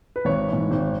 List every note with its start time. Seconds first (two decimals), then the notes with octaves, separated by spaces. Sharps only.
0.16 B4
0.25 G#1 C#5
0.48 E3
0.53 G#2
0.71 G#1